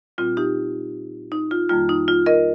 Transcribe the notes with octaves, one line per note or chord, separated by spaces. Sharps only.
A#2 G3 C4 F4
D#4 G4
D#4
F4
F2 D#3 G3 A#3 F4
D#4
F4
A#4 D#5